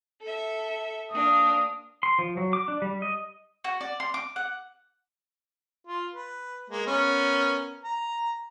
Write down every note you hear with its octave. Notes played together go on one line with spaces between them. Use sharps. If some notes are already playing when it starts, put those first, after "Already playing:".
A4 E5
A#3 D4 F5 D#6
C6
F3
F#3
D6
D4
G3
D#5
F#4
D5
C6
D6
F#5
F4
B4
G#3 A#3
B3 C#4 A#4
A#5